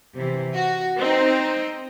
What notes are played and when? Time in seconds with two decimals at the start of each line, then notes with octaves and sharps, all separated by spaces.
0.16 C3 E3
0.53 F#4
0.97 C4 D#4